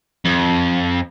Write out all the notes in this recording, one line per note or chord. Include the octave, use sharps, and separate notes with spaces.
F2